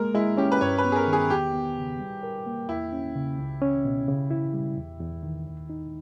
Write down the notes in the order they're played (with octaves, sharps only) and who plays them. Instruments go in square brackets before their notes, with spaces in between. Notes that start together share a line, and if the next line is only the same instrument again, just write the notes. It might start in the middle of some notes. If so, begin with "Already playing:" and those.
Already playing: [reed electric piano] G#3 A#3 [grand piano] A#4
[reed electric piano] G#3 [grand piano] E4
[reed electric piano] C#4 [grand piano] G4
[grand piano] B4
[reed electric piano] G2 [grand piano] C#5
[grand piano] B4
[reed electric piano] B3
[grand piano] G#4
A#4
[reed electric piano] D#3
[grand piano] G#4
[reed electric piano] E2 [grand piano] G4
[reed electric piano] B3
C#3
G3
A#4
A#3
[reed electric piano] E2 [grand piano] E4
[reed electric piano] C#4
C#3
C#2
C#4
B2
C#3
E4
G3
E2
E2
D#3
D#2
D#4